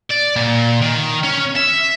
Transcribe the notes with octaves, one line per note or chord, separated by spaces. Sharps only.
D5
A#2
D#3
C#4
E5